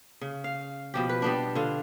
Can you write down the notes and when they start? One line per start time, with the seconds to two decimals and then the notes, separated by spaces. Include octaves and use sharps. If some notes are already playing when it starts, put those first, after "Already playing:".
0.21 C#3
0.44 F5
0.94 B2 F3 G4
1.09 B4
1.22 G3 B3 D4
1.55 D3 F4